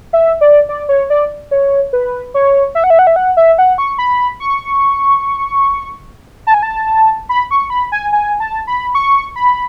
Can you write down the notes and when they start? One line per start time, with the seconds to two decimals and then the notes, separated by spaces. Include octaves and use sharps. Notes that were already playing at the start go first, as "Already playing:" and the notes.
0.13 E5
0.41 D5
0.69 D5
0.89 C#5
1.10 D5
1.51 C#5
1.93 B4
2.34 C#5
2.75 E5
2.84 F#5
2.90 E5
2.99 F#5
3.07 E5
3.16 F#5
3.37 E5
3.58 F#5
3.78 C#6
3.98 B5
4.40 C#6
6.47 A5
6.54 G#5
6.63 A5
7.29 B5
7.51 C#6
7.70 B5
7.92 G#5
8.13 G#5
8.40 A5
8.67 B5
8.95 C#6
9.36 B5